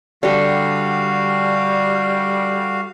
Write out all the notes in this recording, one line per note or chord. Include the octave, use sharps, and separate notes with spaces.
D3 G3 F#4 G4 F5